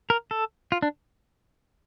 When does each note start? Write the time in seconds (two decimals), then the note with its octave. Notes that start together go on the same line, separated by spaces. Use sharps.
0.10 A#4
0.31 A4
0.72 F4
0.82 D4